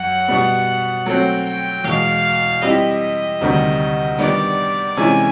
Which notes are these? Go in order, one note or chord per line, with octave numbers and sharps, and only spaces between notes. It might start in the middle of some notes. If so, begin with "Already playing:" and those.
Already playing: F#2 F#3 F#5
B2 G3 B3
F#3 A3 C4 G5
G5
E2 B2 G#3 F5
G3 C4 E4 G4 D#5
D2 C3 D#3 G3
D#3 G3 B3 D4 D5
C3 E3 G#3 C#4 E4 G#5